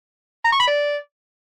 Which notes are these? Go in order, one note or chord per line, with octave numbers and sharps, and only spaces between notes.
A#5
C#6
B5
D5